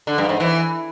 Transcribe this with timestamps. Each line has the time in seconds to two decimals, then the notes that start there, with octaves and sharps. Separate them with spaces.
0.07 D3
0.18 G2
0.29 G#2
0.40 E3